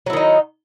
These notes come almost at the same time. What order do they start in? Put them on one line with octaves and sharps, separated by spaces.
F#3 E4 D#3 D#4